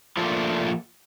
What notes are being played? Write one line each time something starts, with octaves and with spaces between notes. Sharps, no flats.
F3 A3 A#3 D4 F4